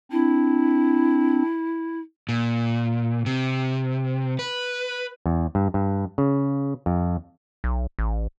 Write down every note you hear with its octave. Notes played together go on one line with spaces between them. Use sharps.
C4 D4 E4
A#2
C3
B4
E2
G2
G2
C#3
F2
B1
A1